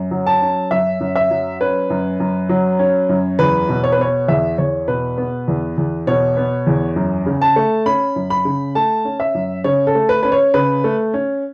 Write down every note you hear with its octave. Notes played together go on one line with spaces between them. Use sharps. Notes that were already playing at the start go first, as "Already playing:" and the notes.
Already playing: F#2
F#3
A5
C#4
F#2 E5
F#2
E5
F#3
C#4 B4
F#2
F#2
F#3
C#4
F#2
E2 B4
B2
C#5
B4
B3 C#5
E2 E5
E2 C#5
B2 B4
B3
E2
E2
B2 C#5
B3
E2
F#2
C#3
A5
A3
C#4 B5
F#2
B5
C#3
A3 A5
C#4
E5
F#2
C#3 C#5
A4
A3
B4
C#4 B4
C#5
C#3 B4
A3
C#4